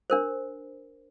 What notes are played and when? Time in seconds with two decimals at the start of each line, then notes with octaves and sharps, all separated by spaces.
0.10 D4 A#4 C5